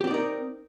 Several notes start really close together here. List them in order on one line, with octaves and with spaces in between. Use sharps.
G4 C4 D5 D#4 A#4